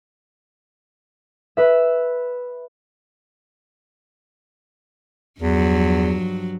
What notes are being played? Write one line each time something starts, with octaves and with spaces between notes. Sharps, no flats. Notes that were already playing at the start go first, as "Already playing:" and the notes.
B4 E5
E2 G2 F3 F#3